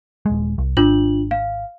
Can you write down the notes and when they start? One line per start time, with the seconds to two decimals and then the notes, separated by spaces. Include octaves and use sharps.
0.26 D#1 G#3
0.58 C2
0.77 G#1 D4 F4 F#7
1.31 F5